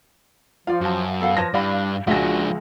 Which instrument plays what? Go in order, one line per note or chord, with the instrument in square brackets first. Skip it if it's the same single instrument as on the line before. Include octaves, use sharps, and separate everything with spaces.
[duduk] F3 [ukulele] F4 D5 [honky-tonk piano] F5
[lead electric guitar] F#2 [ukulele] F#4 A5
[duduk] B3 [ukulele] A4 F5 F#5
[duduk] F3 [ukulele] B4 C#5 A5 [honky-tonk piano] A#6
[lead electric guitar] G2 G3 [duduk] D4 [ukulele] E4 [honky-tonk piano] D5 F5 B5
[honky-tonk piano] C#2 A#6 [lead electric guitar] F3 D4 [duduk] F#4 [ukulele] E5 G#5